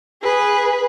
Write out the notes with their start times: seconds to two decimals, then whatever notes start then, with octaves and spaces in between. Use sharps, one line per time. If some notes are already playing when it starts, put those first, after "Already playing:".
0.23 G#4 B4